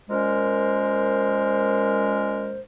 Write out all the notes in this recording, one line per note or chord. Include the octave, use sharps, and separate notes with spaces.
A#2 G#3 C#4 A#4 C5